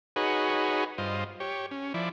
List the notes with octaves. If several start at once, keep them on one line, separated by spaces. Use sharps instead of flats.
D#4 F#4 G#4 B4 C#5
G2 F4 C5 D#5
G4 C#5
C#4
F3 E4 D5